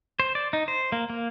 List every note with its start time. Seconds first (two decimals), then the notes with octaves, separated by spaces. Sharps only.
0.20 C5
0.35 D5
0.53 D#4
0.68 C5
0.92 A#3
1.10 A#3